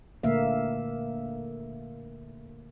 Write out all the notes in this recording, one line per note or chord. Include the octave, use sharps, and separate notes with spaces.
A#2 D3 A3 A#3 E5 F5